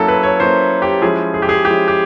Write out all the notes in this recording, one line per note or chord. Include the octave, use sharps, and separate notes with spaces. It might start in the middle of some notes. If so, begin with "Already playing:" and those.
Already playing: F#3 A#3 C#4 E4 A4
B4
C#5
F#3 A#3 C#4 E4 C5
G4
F3 G#3 C#4 E4 G#4
G#4
G4
G#4
F3 G#3 C#4 E4 G4
G4